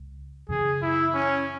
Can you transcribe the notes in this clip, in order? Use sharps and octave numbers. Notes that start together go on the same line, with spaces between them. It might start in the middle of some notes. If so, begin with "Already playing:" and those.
Already playing: C#2
F#2 C#3 E3 G#4
E4
C#4